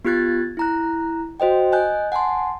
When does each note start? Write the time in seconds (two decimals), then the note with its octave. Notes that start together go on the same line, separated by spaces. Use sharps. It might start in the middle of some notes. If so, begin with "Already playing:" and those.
0.05 B3 F4 G4 F#6 G#6 A6
0.57 E4 A#5 F#6
1.40 F#4 C5 D#5 G5
1.72 D#5 G#5 F#6 G6
2.12 F#5 G#5 A5 C6